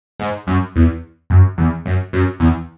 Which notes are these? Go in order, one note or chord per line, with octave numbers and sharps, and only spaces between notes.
G#2
F#2
E2
F#2
E2
F#2
F#2
E2